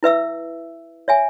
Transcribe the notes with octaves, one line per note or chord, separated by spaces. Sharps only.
E4 B4 E5 E6
C#5 E5 G#5